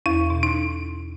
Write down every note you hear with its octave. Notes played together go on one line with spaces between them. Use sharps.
E2 E4
B2
D#4